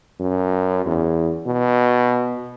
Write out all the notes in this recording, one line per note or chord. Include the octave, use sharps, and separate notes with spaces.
F#2
E2
B2